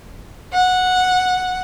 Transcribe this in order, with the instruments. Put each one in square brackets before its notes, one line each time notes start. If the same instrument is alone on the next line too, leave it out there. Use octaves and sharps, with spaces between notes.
[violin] F#5